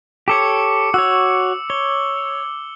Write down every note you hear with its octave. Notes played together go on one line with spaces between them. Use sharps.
G4 A4 C#5 D6 C#7
F#4 C#5 E6
C#5 G7